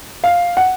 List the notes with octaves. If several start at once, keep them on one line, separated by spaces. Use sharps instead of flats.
F5
F#5